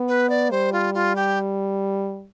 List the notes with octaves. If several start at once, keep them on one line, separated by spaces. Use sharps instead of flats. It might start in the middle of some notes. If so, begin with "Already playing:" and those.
Already playing: B3
B4
D5
G3 C5
F4
F4
G4